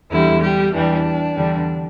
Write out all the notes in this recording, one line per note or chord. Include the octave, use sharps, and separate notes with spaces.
E2 D3 G3 E4
G3 G4
E2 E3 G3 D4
E2 D3 G3